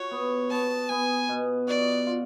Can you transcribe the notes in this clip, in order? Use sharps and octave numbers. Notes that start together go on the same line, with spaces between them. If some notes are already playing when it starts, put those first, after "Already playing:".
Already playing: F#4 C#5
B3
B3 A5
B3 G#5
B2
F#4 D5
F4